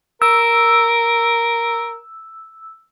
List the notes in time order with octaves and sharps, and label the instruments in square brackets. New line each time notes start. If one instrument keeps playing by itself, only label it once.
[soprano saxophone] A#4 [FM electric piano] E6